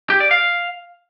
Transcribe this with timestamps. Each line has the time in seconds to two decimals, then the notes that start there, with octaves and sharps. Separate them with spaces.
0.10 G4
0.20 D5
0.31 F5